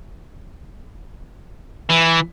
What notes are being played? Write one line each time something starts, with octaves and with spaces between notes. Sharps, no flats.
E3